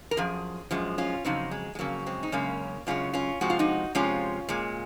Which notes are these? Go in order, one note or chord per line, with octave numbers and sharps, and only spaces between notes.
A#4
F#2 F3 G#4
F#2 F3 G#3
C#4 F4
F2 C#3 F#3 C4 D#4
G#3
G#3
F2 C#3 F#3 A#3
G#3 C4
D#4
F#2 C#3 G#3 A#3 C#4
F#2 C#3 G#3 C#4 F4
C#4 F4
C3 F3 G#3 F#4
F4
D#4 F#4
C3 F3 G#3 C#4 F4
A#2 G#3